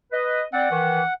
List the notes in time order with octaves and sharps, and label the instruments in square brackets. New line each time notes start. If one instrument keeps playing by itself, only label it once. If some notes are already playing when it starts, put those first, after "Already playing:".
[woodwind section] B4 D#5
[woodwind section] C4 D5 [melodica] F#5
[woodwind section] D#3 E3